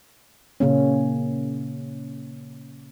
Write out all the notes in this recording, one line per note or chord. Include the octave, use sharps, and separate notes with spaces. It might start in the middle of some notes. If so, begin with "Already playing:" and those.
A#2 C#3 A#3 C#4